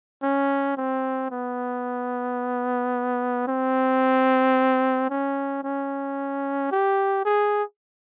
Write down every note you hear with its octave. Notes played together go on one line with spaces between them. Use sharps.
C#4
C4
B3
C4
C#4
C#4
G4
G#4